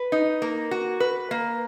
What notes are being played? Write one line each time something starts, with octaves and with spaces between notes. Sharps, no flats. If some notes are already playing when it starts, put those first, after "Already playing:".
Already playing: B4
D#4
A#3
F#4
B4
A#3